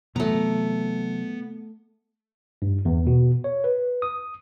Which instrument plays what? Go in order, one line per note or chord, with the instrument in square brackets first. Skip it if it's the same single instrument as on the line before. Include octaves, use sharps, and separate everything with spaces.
[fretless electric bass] C3 E3 F#3 [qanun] A3 A#5 [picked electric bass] B3
[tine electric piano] G2
E2
B2
C#5
B4
D#6